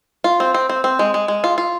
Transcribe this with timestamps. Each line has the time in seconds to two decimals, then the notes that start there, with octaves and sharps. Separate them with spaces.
0.24 F4
0.40 C4
0.54 C4
0.70 C4
0.84 C4
0.99 G#3
1.14 G#3
1.28 G#3
1.44 F4
1.58 F4